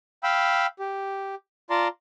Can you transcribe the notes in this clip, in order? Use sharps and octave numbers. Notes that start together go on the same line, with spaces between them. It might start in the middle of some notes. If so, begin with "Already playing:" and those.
F5 G5 B5 E6
G4
F4 D5 A5 A#5 C6